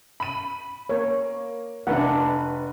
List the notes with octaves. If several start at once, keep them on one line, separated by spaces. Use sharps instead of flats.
B5 D#7
A#3 C#5
F1 D4 B4 F#5